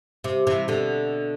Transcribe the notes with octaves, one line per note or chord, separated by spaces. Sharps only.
C3
C3 E3
B2 D3